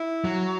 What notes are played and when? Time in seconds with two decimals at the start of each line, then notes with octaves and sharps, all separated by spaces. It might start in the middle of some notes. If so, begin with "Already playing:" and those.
Already playing: E4
0.24 F#3